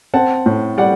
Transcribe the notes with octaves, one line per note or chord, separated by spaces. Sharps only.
C4 F#5 A5
A2
G3 D5 F#5